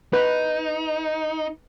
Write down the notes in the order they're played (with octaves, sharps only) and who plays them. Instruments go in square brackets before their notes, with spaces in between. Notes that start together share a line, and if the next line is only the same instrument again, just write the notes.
[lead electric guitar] D#4 [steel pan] B4